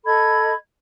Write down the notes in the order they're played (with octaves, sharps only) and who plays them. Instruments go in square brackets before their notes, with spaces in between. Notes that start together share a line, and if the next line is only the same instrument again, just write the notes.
[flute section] A4 D#5 B5 G#6